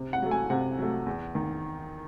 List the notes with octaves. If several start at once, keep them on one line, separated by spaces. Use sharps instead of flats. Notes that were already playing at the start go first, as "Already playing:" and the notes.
Already playing: C3
F#5
F#3 A3
G#5
C3 F#5
F#3 A3
E2
D#3